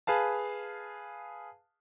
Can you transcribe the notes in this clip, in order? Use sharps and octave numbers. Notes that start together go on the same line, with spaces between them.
G#4 B4 F5 A5